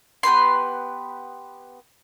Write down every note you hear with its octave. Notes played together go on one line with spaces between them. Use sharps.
B3 G4 B4 C6